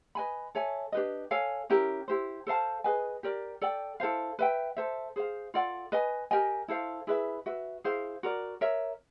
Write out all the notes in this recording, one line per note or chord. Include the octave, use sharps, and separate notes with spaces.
B4 D#5 G#5 B5
A4 C#5 E5 G#5
D4 G4 B4 D#5
A4 C#5 F5 G#5
C#4 E4 G4 A#4
E4 G4 C5
A4 C5 F5 A5
G#4 B4 D#5 G#5
G4 A#4 D5
A4 D5 G5
E4 A4 C5 F5
B4 E5 G5
A4 C5 E5
G#4 C5 F5
F4 A4 D5 F#5
B4 D#5 G#5
G4 A#4 D#5 G#5
E4 A4 C5 F5
E4 G#4 B4 E5
F#4 B4 E5
E4 G#4 C5 F5
F#4 A#4 D5
A#4 C#5 E5